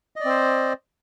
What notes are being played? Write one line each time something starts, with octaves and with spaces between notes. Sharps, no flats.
C4 C5 D5 D#5